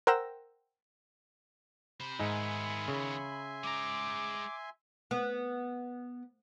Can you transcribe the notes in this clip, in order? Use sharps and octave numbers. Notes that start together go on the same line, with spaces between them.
A#4 C5 F#5 G5 E6 A#6
C3 C5 B5
G#2 D#3 B3 D#4 E5 G#5 C6
C#3
G#3 A#5 D6
B3